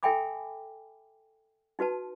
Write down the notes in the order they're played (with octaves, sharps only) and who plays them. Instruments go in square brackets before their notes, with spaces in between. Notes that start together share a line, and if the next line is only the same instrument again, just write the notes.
[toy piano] A4 E5 G5 G#5 B5 D6
D#4 F#4 B4 A5